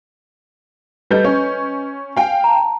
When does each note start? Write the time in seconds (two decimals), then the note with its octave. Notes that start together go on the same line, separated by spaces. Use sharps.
1.11 G3 A4 B4 D#5 G6
1.24 C#4
2.16 F5 G5 G#5
2.44 A5 A#5